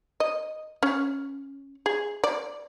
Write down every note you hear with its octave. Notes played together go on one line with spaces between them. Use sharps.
D#5
C#4
G#4
D5